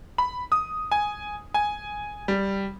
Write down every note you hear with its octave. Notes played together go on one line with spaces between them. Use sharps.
B5
D#6
G#5
G#5
G3